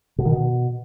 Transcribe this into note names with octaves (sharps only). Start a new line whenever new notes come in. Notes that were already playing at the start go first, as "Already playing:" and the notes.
B2
D#3
B2